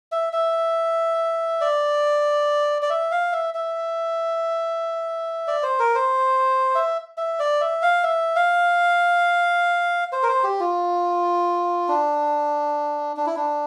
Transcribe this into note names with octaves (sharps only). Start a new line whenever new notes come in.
E5
E5
D5
D5
E5
F5
E5
E5
D5
C5
A#4
C5
E5
E5
D5
E5
F5
E5
F5
C5
A#4
C5
G4
F4
D4
D4
E4
D4